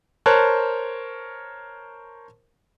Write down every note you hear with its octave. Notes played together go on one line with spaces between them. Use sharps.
A#4 C5 C#5 A5 F#6